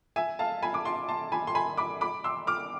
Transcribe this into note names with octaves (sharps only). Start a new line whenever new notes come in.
E5 G#5
F5 A5
G#5 B5
D6
A5 C6
A5 C6
G#5 B5
C6
G#5 B5
B5 D6
B5 D6
C6 E6
D6 F6